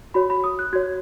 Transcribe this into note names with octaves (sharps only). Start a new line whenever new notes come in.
F#4 C#5 B5
B5
D#6
F#6
F#4 C#5 G#6